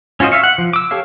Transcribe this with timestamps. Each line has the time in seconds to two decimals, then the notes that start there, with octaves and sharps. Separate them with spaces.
0.20 C#4 F4 F#4 C5 D#5
0.32 E5 F5 C#6
0.43 F#5
0.58 F3
0.73 D6 E6
0.91 G4 A4 C#5 F5